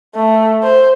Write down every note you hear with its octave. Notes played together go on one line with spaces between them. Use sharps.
A3
C5